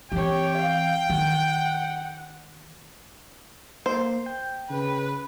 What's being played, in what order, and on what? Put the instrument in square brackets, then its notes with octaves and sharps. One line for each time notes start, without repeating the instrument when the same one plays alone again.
[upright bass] E3 C4 [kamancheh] G4 C#5 [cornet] G5
[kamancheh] F5
[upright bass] D#3 [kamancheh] F#5
[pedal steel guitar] A#3 [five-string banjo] C5
[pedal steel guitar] G5
[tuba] C#3 [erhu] B4